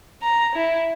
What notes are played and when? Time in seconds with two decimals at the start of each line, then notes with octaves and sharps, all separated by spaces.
0.23 A#5
0.56 E4